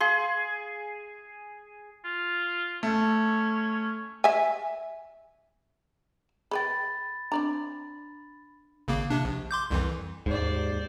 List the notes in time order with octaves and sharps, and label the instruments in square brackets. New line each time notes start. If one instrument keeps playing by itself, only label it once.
[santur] G#4 [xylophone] F5 C6
[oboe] F4
[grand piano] A3 [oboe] C#4
[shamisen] E5 G#5
[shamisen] G#4 B4 G5 [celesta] B5 A6
[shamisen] C4 D5 A#5 [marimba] D4
[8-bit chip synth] G#1 C#3 A#3
C3 D4
A#1
C6 D6 G6
C2 F2 E3
[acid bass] D#2 [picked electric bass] G#2 [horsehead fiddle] C5 D5